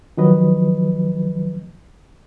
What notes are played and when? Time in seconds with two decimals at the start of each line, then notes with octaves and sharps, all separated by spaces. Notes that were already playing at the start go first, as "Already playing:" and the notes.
0.17 D#3 F3 F#3 B4 D#5